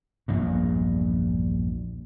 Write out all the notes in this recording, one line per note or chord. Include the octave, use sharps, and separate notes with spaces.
A#1 E2 G2